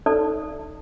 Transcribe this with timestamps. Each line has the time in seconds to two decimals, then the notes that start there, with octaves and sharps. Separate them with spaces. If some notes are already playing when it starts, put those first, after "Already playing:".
0.06 D#4 A4 D5